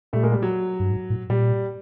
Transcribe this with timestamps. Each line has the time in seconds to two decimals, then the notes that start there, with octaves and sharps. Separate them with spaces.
0.13 A#2 G3 A3
0.23 G#3 A#3
0.32 G3
0.43 F#3
0.80 G2
0.91 G#2
1.10 A2
1.29 A#2 G3